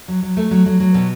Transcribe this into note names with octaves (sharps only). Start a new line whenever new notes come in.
F#3
F#3
A3
F#3
F#3
F#3
B2